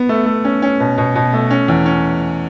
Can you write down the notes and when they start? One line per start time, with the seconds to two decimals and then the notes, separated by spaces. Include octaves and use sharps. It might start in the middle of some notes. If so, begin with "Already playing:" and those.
Already playing: B3
0.09 A3
0.26 A3
0.44 C#4
0.62 C#4
0.80 B2
0.98 B2
1.15 B2
1.33 A3
1.50 C#4
1.68 E2
1.86 C#4